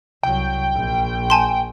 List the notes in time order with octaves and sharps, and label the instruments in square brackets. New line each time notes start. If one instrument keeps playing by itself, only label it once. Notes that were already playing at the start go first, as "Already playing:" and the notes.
[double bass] C2 F#3 [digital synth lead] G5
[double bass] A#1
[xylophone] G#5 A5 C6